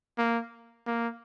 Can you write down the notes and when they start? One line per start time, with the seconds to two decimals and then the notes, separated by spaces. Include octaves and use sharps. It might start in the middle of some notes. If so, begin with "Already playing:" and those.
0.18 A#3
0.87 A#3